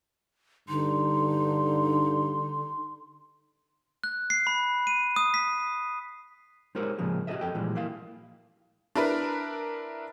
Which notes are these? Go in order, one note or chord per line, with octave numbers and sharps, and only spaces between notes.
G2 D3 D#4 C6
F#6
C7
B5
D#7
D#6
B6
G#3 D#4 G4 A#4 C5 C#5
A2 C#3 F3 G#3 A#3
F#4 G4 A4 B4 D#5 E5
F2 A4 G5
A#2 E3 F3 G3 G#3
A#3 E4 F5
D4 E4 A#4 B4